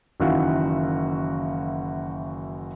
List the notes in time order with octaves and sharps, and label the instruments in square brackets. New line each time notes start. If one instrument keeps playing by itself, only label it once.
[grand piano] F#1 D#3 E3 F#4 F5